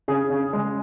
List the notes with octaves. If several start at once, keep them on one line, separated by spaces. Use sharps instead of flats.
C#3 G#4
C#3
G#3